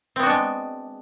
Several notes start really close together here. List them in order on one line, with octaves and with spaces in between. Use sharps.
C4 B3 F#4 D4 G#3